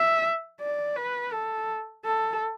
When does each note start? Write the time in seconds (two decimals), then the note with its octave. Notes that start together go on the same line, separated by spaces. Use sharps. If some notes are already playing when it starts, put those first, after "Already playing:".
Already playing: E5
0.61 D5
0.96 B4
1.32 A4
2.05 A4